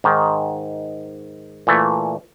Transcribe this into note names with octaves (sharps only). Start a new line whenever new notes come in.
G#2 D#3
A#2 E3 A3